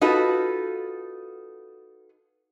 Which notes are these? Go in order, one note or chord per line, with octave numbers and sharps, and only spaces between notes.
D#4 F4 F#4 A4 B4